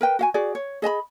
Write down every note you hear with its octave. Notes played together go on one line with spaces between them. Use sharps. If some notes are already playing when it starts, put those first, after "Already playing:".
A#4 B4 G5
F#4 F5 G#5
F#4 G#4 D5
C#5
G#4 D#5 A5 B5